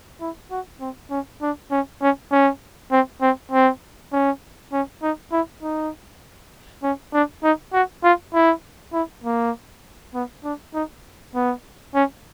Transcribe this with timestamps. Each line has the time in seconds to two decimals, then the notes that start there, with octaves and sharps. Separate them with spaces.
0.21 E4
0.51 F#4
0.80 C4
1.11 C#4
1.42 D4
1.71 C#4
2.01 C#4
2.32 C#4
2.92 C4
3.22 C4
3.51 C4
4.13 C#4
4.73 C#4
5.02 D#4
5.32 E4
5.62 D#4
6.83 C#4
7.14 D4
7.43 D#4
7.73 F#4
8.03 F4
8.34 E4
8.93 E4
9.24 A#3
10.14 B3
10.44 D4
10.74 D#4
11.35 B3
11.95 C#4